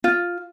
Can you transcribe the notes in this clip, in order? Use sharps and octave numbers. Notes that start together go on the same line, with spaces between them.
F4